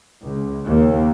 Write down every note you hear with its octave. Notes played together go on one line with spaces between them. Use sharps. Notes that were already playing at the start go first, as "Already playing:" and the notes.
C#2
D#2